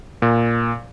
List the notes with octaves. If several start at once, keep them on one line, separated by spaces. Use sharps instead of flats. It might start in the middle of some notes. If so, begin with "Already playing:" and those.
A#2